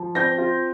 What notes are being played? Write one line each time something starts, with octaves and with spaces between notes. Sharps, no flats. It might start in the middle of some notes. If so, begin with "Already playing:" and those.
Already playing: F3
C4 G6 A#6
F4